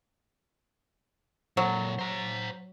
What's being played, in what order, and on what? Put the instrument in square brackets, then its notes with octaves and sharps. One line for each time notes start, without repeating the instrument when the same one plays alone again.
[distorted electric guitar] A#2 A4 [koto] F#3
[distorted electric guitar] C5 A#5